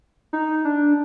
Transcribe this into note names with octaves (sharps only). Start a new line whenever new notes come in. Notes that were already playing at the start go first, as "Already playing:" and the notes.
D#4
D4